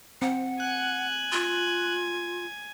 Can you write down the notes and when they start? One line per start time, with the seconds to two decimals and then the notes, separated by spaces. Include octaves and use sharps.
0.22 C4 F#5
0.60 G#5 F#6
1.32 F4